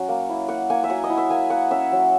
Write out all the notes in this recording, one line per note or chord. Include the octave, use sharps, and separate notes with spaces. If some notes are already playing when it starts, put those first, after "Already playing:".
Already playing: F#3 C#4 F#5
A#3
E4
A#3 F#5
A#3 G#5
E5
F#3 F#5
D#5
E4
E5
A#3 G#5
A#3 F#5
C#4 E5
F#3